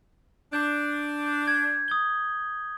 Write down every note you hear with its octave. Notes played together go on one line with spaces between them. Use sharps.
D4 G6
G6
G#6
D#6 G#6 G7